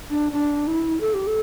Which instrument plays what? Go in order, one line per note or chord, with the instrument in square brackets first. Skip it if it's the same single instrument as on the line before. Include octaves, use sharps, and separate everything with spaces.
[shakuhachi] D4
D4
E4
A4
G4
A4